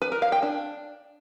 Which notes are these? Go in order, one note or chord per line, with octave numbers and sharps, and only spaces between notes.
B4
A#4
F5
G5
D4